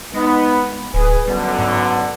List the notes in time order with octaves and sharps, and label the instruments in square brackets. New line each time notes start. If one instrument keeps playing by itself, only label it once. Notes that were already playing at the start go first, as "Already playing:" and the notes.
[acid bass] G#3 [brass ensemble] B3 D#4
[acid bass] D1 [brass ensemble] G#4 B4
[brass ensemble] F#2 D3 B3 [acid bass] G3
[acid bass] G#2